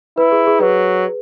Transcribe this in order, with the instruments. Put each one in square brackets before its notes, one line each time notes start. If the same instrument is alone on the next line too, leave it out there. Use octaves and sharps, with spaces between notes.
[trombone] E4 [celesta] B4
[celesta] G#4
G#4
[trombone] F#3 [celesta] B4